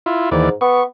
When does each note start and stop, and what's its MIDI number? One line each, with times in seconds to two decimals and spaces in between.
0.06 0.30 64
0.06 0.30 65
0.31 0.49 39
0.31 0.53 44
0.31 0.49 52
0.31 0.49 74
0.61 0.82 59
0.61 0.84 85